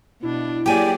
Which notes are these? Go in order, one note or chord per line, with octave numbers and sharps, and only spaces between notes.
B2 D4 E4
F#3 A#3 G4 G#4 D5 G5 G#5